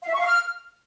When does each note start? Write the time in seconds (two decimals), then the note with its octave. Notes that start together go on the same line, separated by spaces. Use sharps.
0.03 F5
0.09 E5
0.14 C#6
0.20 F5
0.25 F6